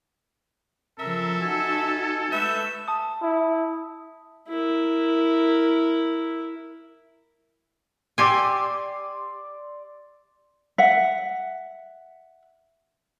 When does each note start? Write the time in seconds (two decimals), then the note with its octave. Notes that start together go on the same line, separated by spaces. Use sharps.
0.99 C#3 F3 A4 A#4 E5
1.41 D#4 F#4 G#5 A5
2.32 G#3 A3 B4 E5 G6
2.88 A5 D#6
3.22 E4
4.48 E4 A#4
8.18 G4 D5 G#5 C6 E6
10.78 E5 F#5